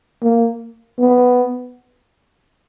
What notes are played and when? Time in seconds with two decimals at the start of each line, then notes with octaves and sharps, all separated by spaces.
0.23 A#3
0.99 B3